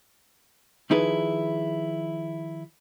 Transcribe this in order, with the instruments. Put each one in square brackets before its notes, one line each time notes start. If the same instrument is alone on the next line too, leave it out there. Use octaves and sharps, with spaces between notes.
[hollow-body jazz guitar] D#3 F3 D#4 E4 G#4 B4